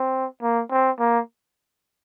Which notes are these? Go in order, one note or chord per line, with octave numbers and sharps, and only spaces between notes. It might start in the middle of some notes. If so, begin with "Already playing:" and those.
Already playing: C4
A#3
C4
A#3